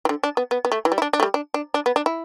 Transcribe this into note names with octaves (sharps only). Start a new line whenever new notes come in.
E3
D3
D4
B3
B3
B3
A3
E3
G3
E4
D4
D4
A3
G3
D4
D4
D4
B3
D4
E4